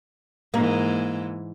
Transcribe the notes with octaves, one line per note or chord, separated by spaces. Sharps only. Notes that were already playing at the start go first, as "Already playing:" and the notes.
G#2 E3 A#3